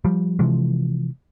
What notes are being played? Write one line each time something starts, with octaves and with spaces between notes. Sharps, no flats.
F3 G3
C3 E3 F3 G#3